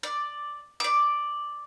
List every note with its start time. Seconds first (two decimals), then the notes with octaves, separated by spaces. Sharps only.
0.03 D5
0.80 D5 D6